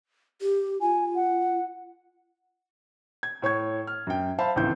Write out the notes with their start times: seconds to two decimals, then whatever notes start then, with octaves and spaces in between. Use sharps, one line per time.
0.41 G4
0.81 F4 G#5
1.16 F#5
3.23 G#6
3.42 A2 C#5 C#6 G#6
3.87 F6
4.07 F#2 G5
4.38 C5 E5 F5 A5 B5
4.56 G#1 C#2 A2 E3 G6